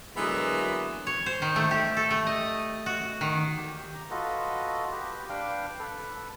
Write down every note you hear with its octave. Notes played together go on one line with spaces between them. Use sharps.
D3 E3 F#3 G#3 A#3 B3
C#5
C5
D#3
A3
G4
A4
A3
D#5
F#4
D#3
G4
A#5
F4 F#4 A4 B4 D#5
G4 B4
D4 B4 F5 G5
A4 B4